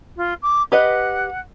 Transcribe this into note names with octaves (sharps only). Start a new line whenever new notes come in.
F4
D6
G4 B4 D#5 F#5